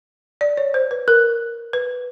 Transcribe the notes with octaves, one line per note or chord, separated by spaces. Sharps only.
D5
C#5
C5
B4
A#4
B4